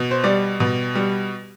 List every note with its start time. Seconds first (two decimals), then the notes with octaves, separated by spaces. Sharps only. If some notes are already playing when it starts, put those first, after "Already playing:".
Already playing: B2
0.11 C5
0.24 G3 D5
0.60 B2
0.95 G3